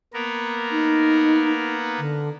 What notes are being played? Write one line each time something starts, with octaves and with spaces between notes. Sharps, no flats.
A#3 B3 A#4
D#4
D3